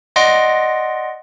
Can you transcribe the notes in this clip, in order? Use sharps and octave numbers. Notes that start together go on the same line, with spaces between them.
D5 D#5 F#5 C6 A#6 D7